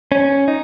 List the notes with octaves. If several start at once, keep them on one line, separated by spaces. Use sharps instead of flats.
C#4
D#4